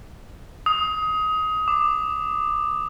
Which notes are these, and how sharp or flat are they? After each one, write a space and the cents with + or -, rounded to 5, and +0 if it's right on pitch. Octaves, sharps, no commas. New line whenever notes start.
D#6 +20
D6 +25